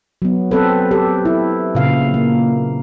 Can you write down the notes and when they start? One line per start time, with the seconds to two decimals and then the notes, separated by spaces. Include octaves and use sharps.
0.22 F#3 B3
0.51 C4 A4 B4
0.91 G4 A4
1.25 E4
1.75 A#2 C#3 F5
2.14 A#3